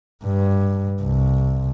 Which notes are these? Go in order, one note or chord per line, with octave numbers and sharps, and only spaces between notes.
G2
C2